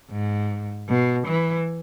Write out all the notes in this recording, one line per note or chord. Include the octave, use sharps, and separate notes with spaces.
G#2
B2
E3